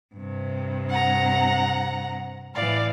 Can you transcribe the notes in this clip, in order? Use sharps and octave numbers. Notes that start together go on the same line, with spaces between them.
G2 C3
F#5 A#5
A2 E3 D5 F5